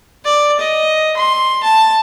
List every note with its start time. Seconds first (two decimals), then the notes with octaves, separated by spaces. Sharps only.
0.25 D5
0.59 D#5
1.17 C6
1.63 A5